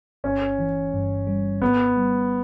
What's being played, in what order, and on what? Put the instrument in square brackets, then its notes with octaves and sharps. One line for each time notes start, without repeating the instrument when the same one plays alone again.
[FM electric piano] G1 [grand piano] C#4
[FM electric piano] E3
G2
G3
[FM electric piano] G#1 [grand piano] B3
[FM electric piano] G3